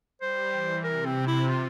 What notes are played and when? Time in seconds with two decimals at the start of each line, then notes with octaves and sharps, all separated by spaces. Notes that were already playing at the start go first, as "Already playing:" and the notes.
0.21 G3 C5
0.53 E3
0.84 C3 A#4
1.06 C4
1.27 E4
1.48 F4